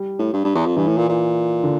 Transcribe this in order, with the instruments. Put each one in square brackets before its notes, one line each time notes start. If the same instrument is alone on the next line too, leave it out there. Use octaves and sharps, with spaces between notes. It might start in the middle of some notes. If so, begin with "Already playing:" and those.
Already playing: [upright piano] G3
[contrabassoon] A2
G2
G2
E2
F2
[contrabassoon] G2 [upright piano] E3
[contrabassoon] A2
A#2
A#2
[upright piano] D3